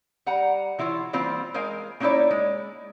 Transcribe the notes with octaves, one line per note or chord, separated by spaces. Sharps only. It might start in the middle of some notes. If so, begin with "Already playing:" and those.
G3 F#5 A#5
E3 E4 F4 C5 C#5
E3 G3 A#3 C4 F4
G#3 A#4 C5 F5 G#5
A#3 C#4 D#4 E4 C#5 D5
G#3